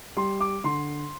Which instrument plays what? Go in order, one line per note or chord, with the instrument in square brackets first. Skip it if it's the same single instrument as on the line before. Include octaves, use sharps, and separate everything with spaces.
[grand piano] G3 C6
D6
D3 C6